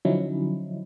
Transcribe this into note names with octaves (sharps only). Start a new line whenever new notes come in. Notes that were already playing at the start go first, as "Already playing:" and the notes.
D3 F3 F#3 C#4 D#4 E4